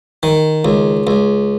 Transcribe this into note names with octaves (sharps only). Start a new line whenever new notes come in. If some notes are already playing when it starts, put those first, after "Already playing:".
D#3
C#2
C#2